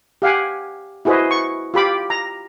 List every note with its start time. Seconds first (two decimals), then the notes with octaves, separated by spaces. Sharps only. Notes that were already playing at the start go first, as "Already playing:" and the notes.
0.22 G4 F5 F#5 G#5
1.05 E4 F#4 G#4 B4 C5 D#5
1.31 C#6
1.74 F4 G4 B5 D6
2.10 A#5